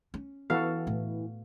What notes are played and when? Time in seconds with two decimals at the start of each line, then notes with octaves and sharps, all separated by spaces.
0.14 C#4
0.50 E3 B3 F#4 A4 F5
0.87 A2